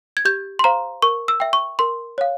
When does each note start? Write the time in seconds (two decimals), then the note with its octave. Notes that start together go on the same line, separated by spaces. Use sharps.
0.17 G#6
0.25 G4 G6
0.59 C6
0.64 C5 F5 A#5
1.02 A#4 C#6
1.28 E6
1.40 E5 G5
1.53 C#6
1.79 A#4 C6
2.18 C#5 F5